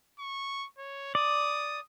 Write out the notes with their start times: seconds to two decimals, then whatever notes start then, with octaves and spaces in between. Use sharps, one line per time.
0.19 C#6
0.78 C#5
1.15 D5 D#6